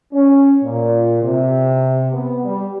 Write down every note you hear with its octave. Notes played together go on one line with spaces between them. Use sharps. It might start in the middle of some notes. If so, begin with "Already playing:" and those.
C#4
A#2
C3
B3
G3